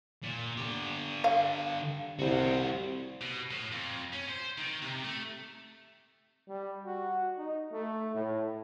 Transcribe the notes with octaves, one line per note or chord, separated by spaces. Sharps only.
A#2
D3 G4
F5
C2 F#4 C5
B2
A2
F2
C#4
C5
D#3
C3
A3
G3
F#4
D#4
A3
A2